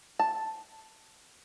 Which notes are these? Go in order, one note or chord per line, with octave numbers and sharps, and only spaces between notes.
A5